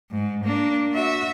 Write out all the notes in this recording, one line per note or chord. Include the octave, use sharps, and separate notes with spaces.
G#2
A#3 D4
F#4 E5